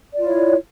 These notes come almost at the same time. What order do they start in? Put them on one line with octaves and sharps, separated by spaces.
D5 F4 E4 C#5